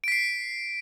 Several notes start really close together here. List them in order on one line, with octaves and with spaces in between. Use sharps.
D7 B6 C7